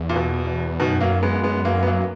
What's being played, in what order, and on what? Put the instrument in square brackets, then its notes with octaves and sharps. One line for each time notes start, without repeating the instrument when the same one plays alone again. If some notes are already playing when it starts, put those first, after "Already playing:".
Already playing: [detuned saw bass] E2
[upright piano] A#2
B2
[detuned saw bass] F#2 [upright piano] B2 D#3
[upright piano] F#3 A#3
G#3 B3
G#3 B3
F#3 A#3
B3
F#3 A#3